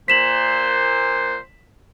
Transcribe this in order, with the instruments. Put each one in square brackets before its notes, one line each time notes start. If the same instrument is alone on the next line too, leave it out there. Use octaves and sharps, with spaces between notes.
[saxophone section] A#2 C5 [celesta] B6 E7 F#7